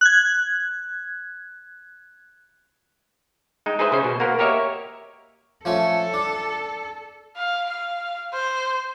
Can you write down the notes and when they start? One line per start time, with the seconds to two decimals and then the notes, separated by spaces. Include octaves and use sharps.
0.01 F#6 G#6
3.66 G#3 D#4 G5
3.79 D#4 G#4 B4 C5 D#5 E5
3.92 C#3 C#4 C5
4.04 B2
4.20 A#3 B3 F#4 A#4 C5
4.39 A#3 G4 A#4 C#5 D#5 E5
5.65 F3 A3 C#4 A4
6.14 D4
7.37 F5
7.70 F5
8.33 C5